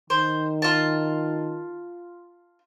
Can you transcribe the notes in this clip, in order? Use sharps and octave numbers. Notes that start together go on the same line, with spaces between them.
D#3 C5
F4 A5